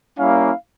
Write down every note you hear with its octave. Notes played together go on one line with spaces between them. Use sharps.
G3 A#3 C#4 E4 F5